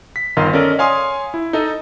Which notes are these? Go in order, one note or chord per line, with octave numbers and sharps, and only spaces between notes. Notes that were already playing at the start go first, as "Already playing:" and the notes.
B6
G1 D#3 A#4 D#5 F5 C6
C#4 A4 A#4 D5 D#5
C#5 F5 G#5 C6 D#6
E4
D#4 A4 D#5